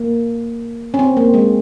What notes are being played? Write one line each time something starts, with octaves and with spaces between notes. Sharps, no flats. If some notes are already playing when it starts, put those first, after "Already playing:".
Already playing: A#3
C#4
C4
A#3
G#3